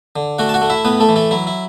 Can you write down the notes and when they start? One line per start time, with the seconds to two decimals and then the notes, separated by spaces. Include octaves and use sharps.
0.16 D3
0.39 A3 F#4 F#5
0.49 A5
0.54 F#4 F#5
0.62 A3
0.70 E4 E5
0.85 A2 B3 B4
1.00 A3 A4
1.09 E3
1.16 A3 A4
1.31 F#3 E4
1.47 E4